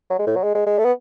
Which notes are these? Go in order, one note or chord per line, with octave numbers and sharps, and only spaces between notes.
F#3
G#3
A2
F#3
G#3
G#3
G#3
A3
B3